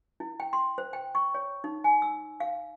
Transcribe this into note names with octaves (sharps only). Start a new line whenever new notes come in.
E4
G5
C6
C5
G5
C#6
C#5
D#4
G#5
E6
F5